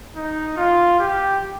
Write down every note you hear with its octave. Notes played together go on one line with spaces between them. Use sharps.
D#4
F4
G4